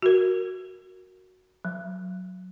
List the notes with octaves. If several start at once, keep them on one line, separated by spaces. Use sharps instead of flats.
F#4 A#4
F#3